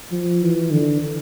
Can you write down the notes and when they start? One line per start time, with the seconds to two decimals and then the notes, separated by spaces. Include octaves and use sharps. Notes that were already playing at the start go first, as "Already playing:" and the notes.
0.12 F3
0.42 E3
0.71 D3